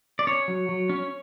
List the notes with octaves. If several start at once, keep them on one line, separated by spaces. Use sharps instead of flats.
D5
C#4 C#5
F#3
F#3
C#4